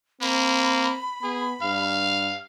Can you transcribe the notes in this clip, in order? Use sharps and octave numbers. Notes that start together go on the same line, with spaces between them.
A#3 C4 B5
B3 G#4
G2 F5